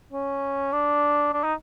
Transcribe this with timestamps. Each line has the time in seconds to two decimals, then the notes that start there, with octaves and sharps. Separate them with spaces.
0.13 C#4
0.72 D4
1.33 D4
1.44 D#4